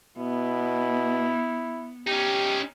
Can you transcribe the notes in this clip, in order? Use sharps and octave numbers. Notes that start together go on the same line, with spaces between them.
B2 B3 E4
C#4 D#4 G4